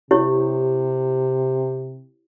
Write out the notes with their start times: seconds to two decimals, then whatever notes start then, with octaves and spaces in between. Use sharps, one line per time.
0.11 C3 E4 G4 C#5